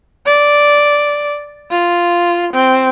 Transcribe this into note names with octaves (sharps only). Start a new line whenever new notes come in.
D5
F4
C4